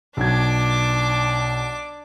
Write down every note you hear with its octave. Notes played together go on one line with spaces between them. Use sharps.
B1 D4 D6 G#6